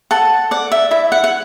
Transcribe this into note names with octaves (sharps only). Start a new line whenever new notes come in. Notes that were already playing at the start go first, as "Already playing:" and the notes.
A4 F#5
D5 F#5
E5
E4 E5
F#5
F#5